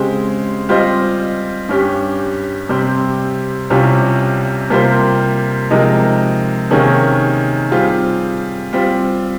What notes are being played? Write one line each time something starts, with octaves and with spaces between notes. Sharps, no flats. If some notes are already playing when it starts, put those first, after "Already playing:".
Already playing: C#3 G#3 C4 G4 C5
G3 C4 F4 C5 D#5
G2 G3 C#4 G4
C3 G3 C4 G4 C5
C2 C3 G3 C#4 F4
C3 G3 A#3 F4 C5
C3 F3 G#3 D#4 A#4
C3 D#3 A#3 C#4 G#4
G3 C4 F4 G#4
G3 C4 F4